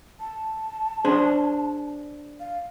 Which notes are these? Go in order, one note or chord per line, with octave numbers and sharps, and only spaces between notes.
A5
D4 G#4 C5
F5